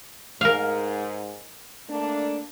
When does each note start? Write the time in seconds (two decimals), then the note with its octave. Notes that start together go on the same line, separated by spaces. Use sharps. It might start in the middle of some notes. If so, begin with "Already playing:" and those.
0.41 G#2 A#4 F5
1.89 A3 A#3 D4